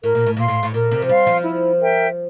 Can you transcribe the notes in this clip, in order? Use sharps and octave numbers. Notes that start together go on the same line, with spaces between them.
A2 A#4
A#2
A2
A#2 F5 C6
A2
A2
A#2 A#4
C3
F3
G3 F5 C6
F3
E4
A#4 E5 G5